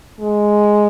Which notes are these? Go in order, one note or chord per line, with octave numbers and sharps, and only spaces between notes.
G#3